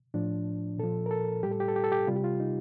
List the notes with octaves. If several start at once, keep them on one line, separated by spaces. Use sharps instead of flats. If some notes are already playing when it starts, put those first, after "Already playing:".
A2 F3 D4
A#2 F3 A4
A#4
A4
A2 G3 G4
A4
G4
A4
G4
A4
G4
C3 G3 F4
G4
F4
D#4